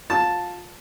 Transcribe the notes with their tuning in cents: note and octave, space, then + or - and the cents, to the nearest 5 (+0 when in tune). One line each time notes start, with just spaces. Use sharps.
F4 +20 A5 +0